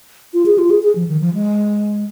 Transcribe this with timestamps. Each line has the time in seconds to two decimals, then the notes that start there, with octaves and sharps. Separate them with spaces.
0.34 F4
0.46 G#4
0.58 F4
0.70 G#4
0.83 G#4
0.96 F3
1.08 D#3
1.21 F3
1.34 G#3